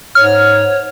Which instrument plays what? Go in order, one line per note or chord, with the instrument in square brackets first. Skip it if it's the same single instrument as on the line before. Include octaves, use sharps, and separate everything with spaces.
[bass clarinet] G#2 [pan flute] C#5 [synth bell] F6